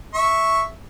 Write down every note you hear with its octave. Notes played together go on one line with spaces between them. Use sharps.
E5 C#6